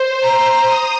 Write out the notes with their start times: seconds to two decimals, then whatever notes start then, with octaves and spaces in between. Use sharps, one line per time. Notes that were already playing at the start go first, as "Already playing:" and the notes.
Already playing: C5
0.22 A#5
0.65 D#6